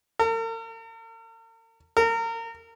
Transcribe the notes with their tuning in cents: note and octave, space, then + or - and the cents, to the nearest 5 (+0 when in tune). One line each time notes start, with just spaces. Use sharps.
A#4 -45
A#4 -30